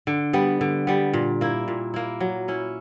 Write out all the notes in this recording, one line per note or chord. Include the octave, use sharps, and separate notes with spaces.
D3
G3 B3
D3
G3 B3
A#2
A#3 E4
A#2
A#3 E4
F#3
C#4 E4